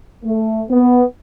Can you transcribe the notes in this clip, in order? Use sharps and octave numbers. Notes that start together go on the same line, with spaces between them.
A3
B3